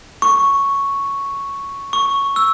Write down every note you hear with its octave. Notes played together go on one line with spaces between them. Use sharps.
C#6
C#6
E6